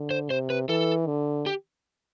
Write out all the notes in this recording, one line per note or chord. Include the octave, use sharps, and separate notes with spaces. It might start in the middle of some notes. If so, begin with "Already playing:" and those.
Already playing: D3
C5
C3 C5
B4
E3 A4
D3
G4